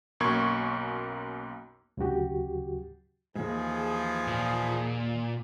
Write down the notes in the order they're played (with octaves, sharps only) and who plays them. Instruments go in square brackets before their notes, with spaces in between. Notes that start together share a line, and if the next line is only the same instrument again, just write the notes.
[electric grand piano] B1 F#2 A#3 C#6 G#6
[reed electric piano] D2 C#3 F#3 F#4 G4
[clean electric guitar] D#2 G#2 [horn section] E3 F3 G#4
[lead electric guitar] A#2